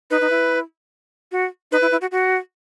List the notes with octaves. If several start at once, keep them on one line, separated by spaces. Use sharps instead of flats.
D#4 B4
D#4
E4
F#4
D#4 B4
E4
E4
F#4
F#4